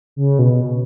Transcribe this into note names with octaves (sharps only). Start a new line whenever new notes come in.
C#3
B2